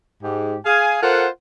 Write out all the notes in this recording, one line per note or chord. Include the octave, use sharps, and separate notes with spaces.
G#2 G4
G#4 F5 G#5
F4 A4 A#4 C5 F#5